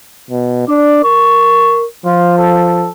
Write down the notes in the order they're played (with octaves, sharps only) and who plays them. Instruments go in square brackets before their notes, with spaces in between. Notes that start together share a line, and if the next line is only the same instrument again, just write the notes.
[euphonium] B2
[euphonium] D4 [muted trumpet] D5
[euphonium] A#4 [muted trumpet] C#6
[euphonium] F3 [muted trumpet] F4
[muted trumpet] A4